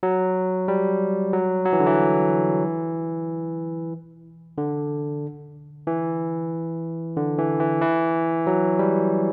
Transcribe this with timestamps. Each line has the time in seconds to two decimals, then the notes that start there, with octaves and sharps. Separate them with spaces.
0.03 F#3
0.68 G3
1.33 F#3
1.65 F#3
1.73 E3
1.80 D3
1.87 E3
4.58 D3
5.87 E3
7.17 D3
7.39 E3
7.60 E3
7.82 E3
8.47 F#3
8.79 G3